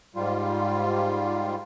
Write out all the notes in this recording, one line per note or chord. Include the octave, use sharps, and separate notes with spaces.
G#2 G3 F4